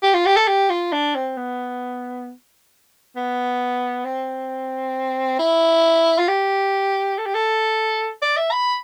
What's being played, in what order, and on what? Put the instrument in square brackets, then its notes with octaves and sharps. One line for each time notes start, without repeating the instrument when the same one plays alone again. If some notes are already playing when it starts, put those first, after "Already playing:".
[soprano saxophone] G4
F4
G4
A4
G4
F4
D4
C4
B3
B3
C4
E4
F4
G4
A4
G4
A4
D5
E5
B5